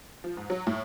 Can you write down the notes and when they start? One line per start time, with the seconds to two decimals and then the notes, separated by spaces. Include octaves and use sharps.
0.24 F3
0.37 G#2
0.50 F#3
0.67 A2